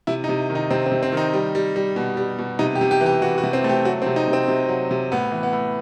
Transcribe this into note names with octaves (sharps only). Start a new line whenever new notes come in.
C3 E4
D#4
C3
D#3
D#4
C3 C4
C4
C3
C4
D#3 D#4
G3
G3
G3
B2
G3
B2
C3 D#4
G4
C3
G4
E3
G4
E3 F#4
F#4
C3
C4
A3 G4
F#3 F#4
C4
C3
D#4
C3
C4
C3
F#3
C3
A2 B3
E3
B3
A2